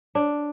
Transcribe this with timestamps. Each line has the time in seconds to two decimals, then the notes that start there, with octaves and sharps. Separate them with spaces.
0.15 D4